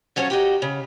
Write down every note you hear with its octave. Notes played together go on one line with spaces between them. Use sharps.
F3 F#3 C#4 A4 C#5
D#4 F#4 G4
C#3